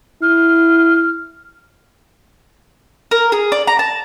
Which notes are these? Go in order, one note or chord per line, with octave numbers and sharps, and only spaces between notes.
E4 F6
A#4
G#4
D5
A#5
A5